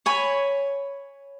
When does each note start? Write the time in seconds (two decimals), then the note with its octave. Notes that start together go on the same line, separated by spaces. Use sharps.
0.06 C#5 G#5 B5